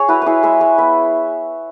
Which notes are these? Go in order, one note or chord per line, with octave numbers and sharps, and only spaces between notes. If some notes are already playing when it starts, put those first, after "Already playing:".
Already playing: G#4 C#5
E4 F#4 B4
E4 G#4 B4 C#5
G#3 B4 E5
G#3 B4 E5
B3 B4 E5